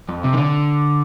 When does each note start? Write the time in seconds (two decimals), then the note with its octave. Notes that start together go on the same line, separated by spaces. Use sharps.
0.09 F2
0.23 C3
0.33 D#3
0.37 D3